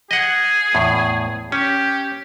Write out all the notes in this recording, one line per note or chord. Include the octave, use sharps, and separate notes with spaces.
G#4 D#5 F#5
E2 A2
C#4 G4